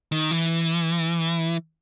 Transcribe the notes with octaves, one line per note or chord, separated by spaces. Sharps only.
D#3
E3